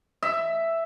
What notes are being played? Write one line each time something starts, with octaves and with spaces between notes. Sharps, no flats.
E5